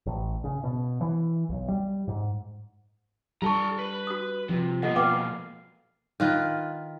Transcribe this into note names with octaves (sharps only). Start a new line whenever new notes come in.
A1
C#3
B2
E3
B1
G3
G#2
G3 F4 A4 A5 A#5 C#6
B4
F#4 D#6
C3 F3
B2 A#3 A4 D#5 F#5
B4 F5 G5 D6
D#3 F4 B4